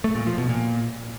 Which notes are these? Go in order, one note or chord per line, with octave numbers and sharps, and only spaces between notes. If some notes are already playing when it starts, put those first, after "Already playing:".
A3
A#2
F3
B2
A#2